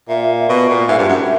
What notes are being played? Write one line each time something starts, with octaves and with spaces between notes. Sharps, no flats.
A#2 E5
B2
A#2
G#2 E5
G2
F#2